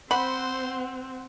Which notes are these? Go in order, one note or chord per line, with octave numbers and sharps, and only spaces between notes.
C4 C5 F#5 B5